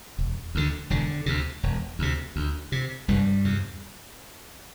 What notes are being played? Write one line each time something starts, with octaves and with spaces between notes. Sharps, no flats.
E1
D2 D3
E1 D3
D2 C3
E1
D2 C3
D2
C3
F1 G2 G3
E2 C3